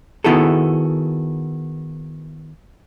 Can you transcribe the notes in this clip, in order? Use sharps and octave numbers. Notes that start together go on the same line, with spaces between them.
D#3 B3 E4 F#4 G#4 A4